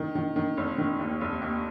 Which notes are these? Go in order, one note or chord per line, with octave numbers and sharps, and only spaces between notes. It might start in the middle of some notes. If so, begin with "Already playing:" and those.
Already playing: D#3
D#3
D#3
F1
D#3
D#2
F1
D#2